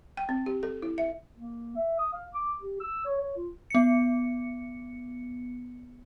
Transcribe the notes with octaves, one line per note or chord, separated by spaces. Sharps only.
G5
C4
G4
A4
E4
E5
A#3
E5
D#6
F5
D6
G4
E6
C#5
C#5
F4
B3 C#7